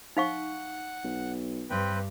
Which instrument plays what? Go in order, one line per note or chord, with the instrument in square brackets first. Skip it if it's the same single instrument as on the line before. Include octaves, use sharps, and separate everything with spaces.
[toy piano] D#4 F5 C#6 [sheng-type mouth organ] F#5
[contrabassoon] B1
[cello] G2 [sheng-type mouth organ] C4 B4 G5